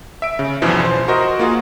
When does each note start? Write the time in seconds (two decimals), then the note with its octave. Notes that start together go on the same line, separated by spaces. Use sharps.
0.22 E5 D7
0.39 C#3
0.62 E2 G2 B2 E3 F3
0.84 C5
1.08 F#4 A#4 C5 D#5
1.39 A#3 F4 F#4 G#4